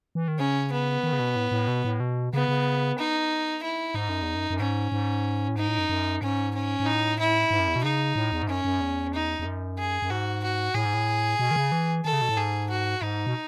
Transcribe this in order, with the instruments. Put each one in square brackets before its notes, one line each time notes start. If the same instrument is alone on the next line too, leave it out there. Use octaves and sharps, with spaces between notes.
[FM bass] E3
D#3
[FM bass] C#3 [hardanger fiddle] C#4
[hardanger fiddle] B3
[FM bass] D#3
C#3
B2
A2
A2
B2
A2
B2
[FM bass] C#3 [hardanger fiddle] B3
[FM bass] C#3
[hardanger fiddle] D#4
E4
[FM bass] G#2 [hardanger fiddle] D#4
[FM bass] F#2
E2
F#2
F#2
[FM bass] G#2 [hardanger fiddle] C#4
[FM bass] G#2
A2
[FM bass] G#2 [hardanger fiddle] D#4
[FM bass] A2
F#2
F#2
[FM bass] G#2 [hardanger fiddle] C#4
[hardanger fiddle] C#4
[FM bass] G#2
[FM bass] A2 [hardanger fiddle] D#4
[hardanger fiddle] E4
[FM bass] G#2
F#2
E2
B2
[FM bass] C#3 [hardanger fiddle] D#4
[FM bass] A2
E2
G#2
[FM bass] F#2 [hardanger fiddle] C#4
[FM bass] F#2
E2
[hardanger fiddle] D#4
[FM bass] E2
F#2
[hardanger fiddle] G#4
[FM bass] F#2
[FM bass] G#2 [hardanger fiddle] F#4
[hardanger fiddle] F#4
[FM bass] A2 [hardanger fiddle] G#4
[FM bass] G#2
A2
B2
D#3
C#3
E3
[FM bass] D#3 [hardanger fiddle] A4
[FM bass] C#3
B2
A2
[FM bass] G#2 [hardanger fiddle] G#4
[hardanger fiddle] F#4
[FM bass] G#2 [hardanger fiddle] D#4
[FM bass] B2